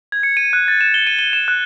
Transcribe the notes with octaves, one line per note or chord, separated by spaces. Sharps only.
G#6
C#7
D#7
F#6
A6
E7
G7
D#7
G7
E7
F#6